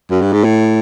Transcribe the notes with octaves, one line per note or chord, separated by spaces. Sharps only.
F#2
G2
G#2
A2